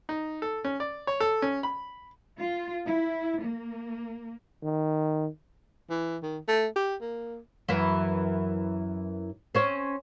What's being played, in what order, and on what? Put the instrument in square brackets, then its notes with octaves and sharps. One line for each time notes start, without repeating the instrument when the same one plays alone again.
[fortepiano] D#4
A4
C#4
D5
C#5
A4
C#4
B5
[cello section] F4
E4
A#3
[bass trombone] D#3
[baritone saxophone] E3
D#3
A3
G4
A#3
[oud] F#2 E3 E4
C4 C#4 C5